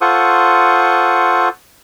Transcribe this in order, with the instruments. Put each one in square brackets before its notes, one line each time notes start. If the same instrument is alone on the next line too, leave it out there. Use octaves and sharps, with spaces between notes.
[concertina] F4 A4 C5 F#5 C#6 D#6